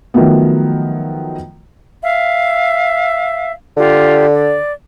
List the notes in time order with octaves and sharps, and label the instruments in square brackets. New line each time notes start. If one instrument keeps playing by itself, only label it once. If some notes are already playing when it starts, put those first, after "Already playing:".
[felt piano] D#3 F3 F#3 A3 B3
[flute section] E5 F5
[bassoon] D3 [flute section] F4 G4
[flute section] D5